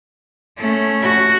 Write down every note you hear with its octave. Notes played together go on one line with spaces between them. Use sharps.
A3 C#4
F#4